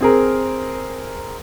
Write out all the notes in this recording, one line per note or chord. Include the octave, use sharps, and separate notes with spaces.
C4 G#4 A#4